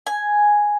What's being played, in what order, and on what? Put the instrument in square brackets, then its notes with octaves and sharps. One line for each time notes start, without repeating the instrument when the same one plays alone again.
[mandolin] G#5